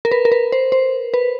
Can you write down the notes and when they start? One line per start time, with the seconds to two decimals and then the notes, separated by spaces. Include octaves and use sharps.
0.05 A#4
0.12 B4
0.25 A#4
0.32 B4
0.52 C5
0.72 C5
1.14 B4